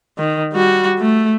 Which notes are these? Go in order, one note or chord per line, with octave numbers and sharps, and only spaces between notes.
D#3
G3 F#4
A3